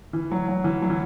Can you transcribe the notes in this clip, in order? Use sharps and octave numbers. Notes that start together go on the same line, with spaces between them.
E3
F#3
F#3
E3
F#3
E3